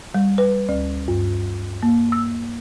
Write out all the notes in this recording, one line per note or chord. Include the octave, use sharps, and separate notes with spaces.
G3
B4
D2
G2
A#3
E6